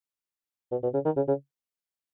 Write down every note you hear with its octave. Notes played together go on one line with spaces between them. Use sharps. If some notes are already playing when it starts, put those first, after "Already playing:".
B2
B2
C#3
D#3
C#3
C#3